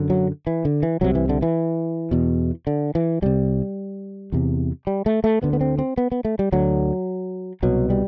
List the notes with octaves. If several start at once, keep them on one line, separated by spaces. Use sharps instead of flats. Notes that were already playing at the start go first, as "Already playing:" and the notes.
Already playing: F#2 D3
F#3
E3
D3
E3
C2 C3 F#3
E3
D3
E3
E2 B2
D3
E3
C2 C3 G3
E2 C3
G3
A3
A3
D2 D3 B3
B3
C4
C4
B3
B3
A3
G3
D2 D3 F#3
C2 B2 F#3
G3